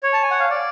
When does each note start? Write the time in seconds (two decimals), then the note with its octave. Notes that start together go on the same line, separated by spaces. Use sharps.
0.03 C#5
0.13 A5
0.23 G#5
0.31 F#5
0.40 F5
0.50 D5